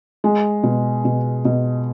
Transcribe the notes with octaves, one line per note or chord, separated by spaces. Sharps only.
G#3
B2
B2
B2